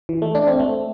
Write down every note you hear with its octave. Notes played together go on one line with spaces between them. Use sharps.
E3
A3
D4
C4
A3